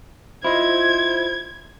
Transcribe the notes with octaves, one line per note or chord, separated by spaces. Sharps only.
E4 F4 C5 D#5 G#6